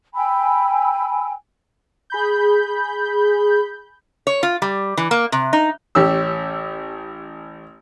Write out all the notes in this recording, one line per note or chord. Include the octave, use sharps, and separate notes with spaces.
G5 G#5 B5 E6
G#4 B5 G6
C#5
F4
G3
E3
A#3
C3
D#4
A1 C#4 G4 E6